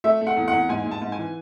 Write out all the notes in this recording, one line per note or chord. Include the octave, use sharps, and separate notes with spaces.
A3 E5
A3
F#5
E2
F#5
E2
G#2 G#5
G#2
A5
G#2
G#5
E3